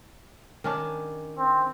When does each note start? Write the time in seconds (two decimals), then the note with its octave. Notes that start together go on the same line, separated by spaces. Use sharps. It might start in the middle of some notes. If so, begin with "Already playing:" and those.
0.64 D#3 C#4 D4
1.38 C4